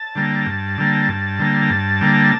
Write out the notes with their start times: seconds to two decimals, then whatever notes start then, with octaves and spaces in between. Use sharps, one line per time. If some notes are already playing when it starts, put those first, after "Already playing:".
Already playing: A5
0.15 D3 G3 A#3
0.46 G2
0.78 D3 G3 A#3
1.09 G2
1.39 D3 G3 A#3
1.70 G2
2.01 D3 G3 A#3